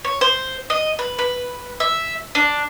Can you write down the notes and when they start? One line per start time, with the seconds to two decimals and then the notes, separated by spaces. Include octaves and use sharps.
0.05 C#5
0.21 C5
0.70 D#5
0.99 B4
1.19 B4
1.80 E5
2.35 D4